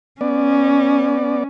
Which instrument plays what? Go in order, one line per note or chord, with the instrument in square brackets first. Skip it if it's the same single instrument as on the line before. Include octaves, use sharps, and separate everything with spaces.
[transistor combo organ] B3 D5 [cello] C#4